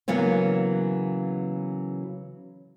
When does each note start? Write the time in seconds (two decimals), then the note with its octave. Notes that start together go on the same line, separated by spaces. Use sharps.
0.08 C#3 E3 F#3 A#3 B3